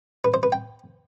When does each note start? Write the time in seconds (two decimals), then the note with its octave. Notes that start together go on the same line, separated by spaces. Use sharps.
0.24 B4
0.34 C5
0.43 B4
0.52 G5